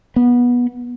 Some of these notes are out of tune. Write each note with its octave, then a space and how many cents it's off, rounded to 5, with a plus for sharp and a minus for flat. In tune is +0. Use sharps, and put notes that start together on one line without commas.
B3 -20